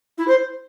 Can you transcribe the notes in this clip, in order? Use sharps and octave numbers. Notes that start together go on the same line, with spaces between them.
E4
C5